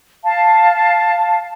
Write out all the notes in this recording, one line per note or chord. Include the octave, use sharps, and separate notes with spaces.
F5 A5